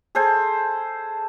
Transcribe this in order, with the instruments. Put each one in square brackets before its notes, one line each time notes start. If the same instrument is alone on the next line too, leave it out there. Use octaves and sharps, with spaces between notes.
[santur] G#4 A4 C5 G#5